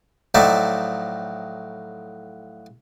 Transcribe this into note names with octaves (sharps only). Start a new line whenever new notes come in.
A2 F3 F#3 D#4 D5 E5